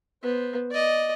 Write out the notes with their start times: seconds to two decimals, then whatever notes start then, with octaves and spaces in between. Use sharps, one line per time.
0.23 B3 C5
0.71 D5 D#5